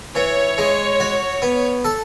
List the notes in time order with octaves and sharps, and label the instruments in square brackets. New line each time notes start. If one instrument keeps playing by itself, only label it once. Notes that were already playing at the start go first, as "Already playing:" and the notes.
[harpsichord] E3 [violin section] C#5
[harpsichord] G#3
F#4
B3
A4